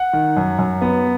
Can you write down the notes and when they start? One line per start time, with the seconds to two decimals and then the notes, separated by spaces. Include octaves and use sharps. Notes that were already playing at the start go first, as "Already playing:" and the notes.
Already playing: F#5
0.13 D#3
0.37 F#2
0.59 F#2
0.81 B3